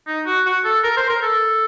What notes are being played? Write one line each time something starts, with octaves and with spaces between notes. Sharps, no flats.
D#4
F#4
F#4
A4
A#4
C5
A#4
A4